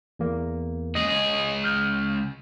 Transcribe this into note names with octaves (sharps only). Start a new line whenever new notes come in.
E2 A#3
C#2 G#4 D#5
F6 G6